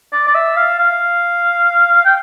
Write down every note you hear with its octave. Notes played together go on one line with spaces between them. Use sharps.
D5
D5
E5
F5
F5
G5